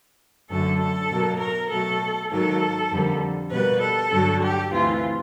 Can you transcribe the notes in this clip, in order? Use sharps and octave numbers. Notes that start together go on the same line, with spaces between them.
F#2 D3 F#3 A3 A4
A4
B2 F#3 A#3
A#4
B2 F#3 A3 A4
G#2 D#3 F#3 A#3 A4
F2 D3 G3 A#3
B2 G3 A#3 B4
A4
G2 D3 F#3
G4
D2 C3 E3 F4